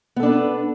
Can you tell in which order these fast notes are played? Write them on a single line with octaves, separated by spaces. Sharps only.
B3 A4 D4 B4